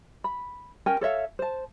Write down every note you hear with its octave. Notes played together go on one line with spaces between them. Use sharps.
B5
C#4 A#4 G5 G#5
A4 C#5 E5 F5
C5 A5